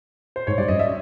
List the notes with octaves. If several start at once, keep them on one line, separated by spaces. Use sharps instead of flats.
C5
G#2 C#5
G2 D5
F#2 D#5
E5